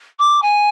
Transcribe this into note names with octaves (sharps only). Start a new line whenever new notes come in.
D6
G#5